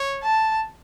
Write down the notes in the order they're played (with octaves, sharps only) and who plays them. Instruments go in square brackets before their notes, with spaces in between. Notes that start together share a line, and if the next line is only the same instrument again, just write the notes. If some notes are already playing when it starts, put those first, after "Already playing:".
Already playing: [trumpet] C#5
[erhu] A5